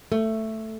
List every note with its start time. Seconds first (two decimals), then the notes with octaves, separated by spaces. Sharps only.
0.12 A3